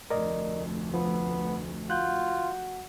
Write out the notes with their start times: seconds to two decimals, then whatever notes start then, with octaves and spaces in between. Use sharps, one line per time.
0.10 F1 D2 A#4 D5 D#5
0.94 F3 B3
1.90 F4 F#4 F#6 G6